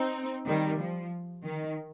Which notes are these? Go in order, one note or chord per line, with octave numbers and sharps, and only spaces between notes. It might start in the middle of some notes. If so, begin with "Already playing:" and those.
Already playing: C4 D#4
D#3 G3
F3
D#3